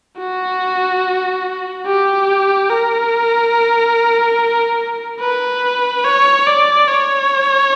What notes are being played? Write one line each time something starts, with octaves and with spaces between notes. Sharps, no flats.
F#4
G4
A#4
B4
C#5
D5
C#5